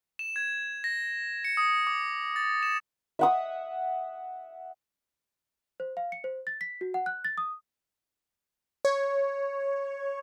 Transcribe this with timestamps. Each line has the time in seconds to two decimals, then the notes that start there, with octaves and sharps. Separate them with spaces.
0.19 E7
0.36 G#6
0.84 A#6
1.45 C#7
1.57 D#6
1.87 D6
2.36 A6
2.63 E7
3.19 E5 F#5 D#6
5.80 C5
5.97 F5
6.12 C#7
6.24 C5
6.47 A6
6.61 B6
6.81 F#4
6.94 F#5
7.06 F#6
7.25 A6
7.38 D#6
8.85 C#5